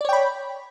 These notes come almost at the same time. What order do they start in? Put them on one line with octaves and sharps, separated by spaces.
D5 C#5 G5 B5